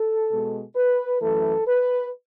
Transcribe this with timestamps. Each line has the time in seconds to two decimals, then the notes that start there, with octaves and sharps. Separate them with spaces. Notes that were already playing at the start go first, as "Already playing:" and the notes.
Already playing: A4
0.30 B2 G#3
0.75 B4
1.22 F#2 E3 A3 A4
1.67 B4